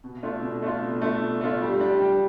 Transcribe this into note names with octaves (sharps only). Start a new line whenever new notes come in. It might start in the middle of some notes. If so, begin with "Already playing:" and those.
B2
A3 D4 F4
B2
A3 D4 F4
B2
A3 D4 F4
B2
A3 D4 F4
G3
D4 G4
G3